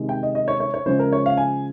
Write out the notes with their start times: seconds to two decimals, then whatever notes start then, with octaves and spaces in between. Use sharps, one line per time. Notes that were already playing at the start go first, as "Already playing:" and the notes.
Already playing: C3 D#3 G#3
0.09 G5
0.23 D#5
0.35 D#5
0.48 C#5
0.60 C#5
0.74 C#5
0.86 C#3 F3 G#3 C5
0.99 A#4
1.12 C#5
1.26 F5
1.37 G#5